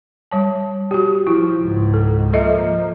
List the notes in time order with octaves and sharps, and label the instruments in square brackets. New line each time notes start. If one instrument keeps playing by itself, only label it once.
[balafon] G3 C#5 A5
F#4 G4
[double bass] F3 [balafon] E4
[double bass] C#2 G#2
[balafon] A4
[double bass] F3 A#3 [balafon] A4 D#5 E5